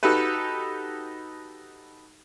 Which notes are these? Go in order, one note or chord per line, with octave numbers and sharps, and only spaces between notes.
D#4 F#4 G4 A4 B4